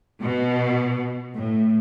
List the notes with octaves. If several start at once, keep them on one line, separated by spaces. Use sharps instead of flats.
B2
A2